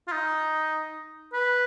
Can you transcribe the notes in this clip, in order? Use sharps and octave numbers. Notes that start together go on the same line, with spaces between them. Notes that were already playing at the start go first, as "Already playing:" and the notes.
F4
D#4
B4